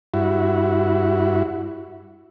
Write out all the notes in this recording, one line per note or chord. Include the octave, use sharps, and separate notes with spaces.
G2 E4 F#4